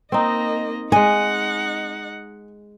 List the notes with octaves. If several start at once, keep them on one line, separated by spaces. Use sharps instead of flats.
A#3 C4 D#4 D#5
G#3 D#4 D#5 F#5 G#5